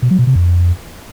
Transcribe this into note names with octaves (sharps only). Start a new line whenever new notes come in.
B2
F#3
B2
C3
F2